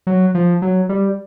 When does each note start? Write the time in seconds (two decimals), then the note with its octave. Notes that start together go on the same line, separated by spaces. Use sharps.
0.07 F#3
0.35 F3
0.62 F#3
0.89 G3